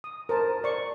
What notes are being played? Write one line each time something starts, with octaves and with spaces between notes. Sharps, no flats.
D#6
A#4 C5 A5
D5 C#6